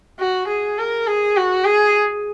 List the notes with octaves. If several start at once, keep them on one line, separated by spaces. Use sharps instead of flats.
F#4
G#4
A#4
G#4
F#4
G#4